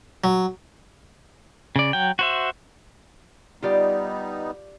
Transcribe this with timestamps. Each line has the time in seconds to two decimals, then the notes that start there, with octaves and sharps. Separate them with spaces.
0.24 F#3
1.76 C#3 D5
1.93 F#3 G5
2.19 F#4 C5 E5
3.62 G3 B3 D#4 F4 G4 D5